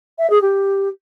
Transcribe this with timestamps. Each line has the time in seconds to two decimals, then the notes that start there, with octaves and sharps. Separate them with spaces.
0.19 E5
0.30 G#4
0.42 G4